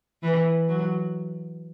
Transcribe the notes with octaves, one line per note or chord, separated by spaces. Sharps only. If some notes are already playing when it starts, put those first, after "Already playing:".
E3
F#3